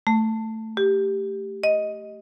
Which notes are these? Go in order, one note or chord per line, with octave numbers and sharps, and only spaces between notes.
A3
G4
D#5